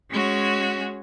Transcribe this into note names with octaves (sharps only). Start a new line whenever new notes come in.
G#3 C#4 F#4 C#5